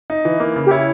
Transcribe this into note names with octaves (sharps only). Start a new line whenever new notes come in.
D#4
E3
A#3
C#3
G4
E4 C#5